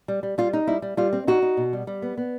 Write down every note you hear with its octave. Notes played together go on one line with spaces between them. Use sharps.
G3
G3
G3 F4
D#4
G3 E4
G3
G3 F4
C4
D#4 F#4
D#4
B2
G3
G3
B3
B3